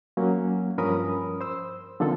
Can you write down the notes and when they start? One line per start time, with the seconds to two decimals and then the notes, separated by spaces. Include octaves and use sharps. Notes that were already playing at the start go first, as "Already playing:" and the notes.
0.17 F#3 A#3 C#4
0.78 G2 F3 C#4 A#4 B5 D#6
1.41 C5 E6
2.00 D3 D#3 F3 A#3 C4 A4